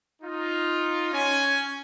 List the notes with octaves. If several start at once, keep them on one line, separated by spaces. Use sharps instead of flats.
D#4 F4
C#4 G#5